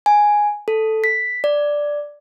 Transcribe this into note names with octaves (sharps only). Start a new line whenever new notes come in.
G#5
A4
B6
D5